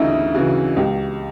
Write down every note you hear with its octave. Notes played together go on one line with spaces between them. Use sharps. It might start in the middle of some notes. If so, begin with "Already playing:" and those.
Already playing: D2 C#3 E3 D#4 E4
C#3 E3 F#4
C#2 G4